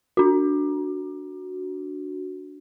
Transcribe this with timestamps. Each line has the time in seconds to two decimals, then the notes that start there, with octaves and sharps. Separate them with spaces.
0.17 D4 F#4